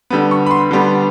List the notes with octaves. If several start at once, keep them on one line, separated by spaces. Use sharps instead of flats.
D3 G3 B3
C#6
B5
C6
D3 G3 B3